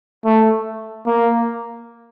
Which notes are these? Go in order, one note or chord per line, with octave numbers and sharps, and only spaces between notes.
A3
A#3